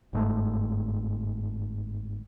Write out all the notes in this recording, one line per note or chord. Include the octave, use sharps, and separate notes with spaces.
G1 G#2 A3